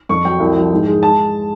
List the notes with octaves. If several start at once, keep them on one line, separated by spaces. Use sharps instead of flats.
F2 C#6
F#3 G5
C2
F3
G#2
G#3
A5